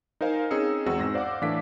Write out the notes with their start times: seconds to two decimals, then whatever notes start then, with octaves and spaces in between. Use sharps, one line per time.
0.21 D#4 A#4 C5 F5 G#5
0.51 C4 C#4 D#4 G#4 E6 C#7
0.86 E2 G#3 C4 F#4 E6
0.99 G#2 A#6
1.14 C5 D5 F5 F#5 D6
1.42 A2 E3 D4 A4 F5 B6